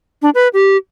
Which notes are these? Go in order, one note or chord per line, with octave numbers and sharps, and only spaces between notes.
D4
B4
G4